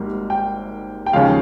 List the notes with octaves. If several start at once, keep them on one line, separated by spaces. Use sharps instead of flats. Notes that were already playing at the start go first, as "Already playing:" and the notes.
Already playing: G#1 G#2 G3 A#3
G5
G5
D#2 C#3 F3 G#3 F5